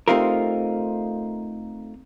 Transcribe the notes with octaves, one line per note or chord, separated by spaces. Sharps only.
A3 C4 D#4 F4 G4 A#4